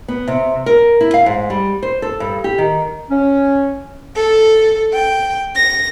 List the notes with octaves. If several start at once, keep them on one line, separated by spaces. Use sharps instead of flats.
B3
C3
A#4
E4
F5
G#2
G3
C5
A4
G2
G4
D#3
C#4
A4
G5
A#6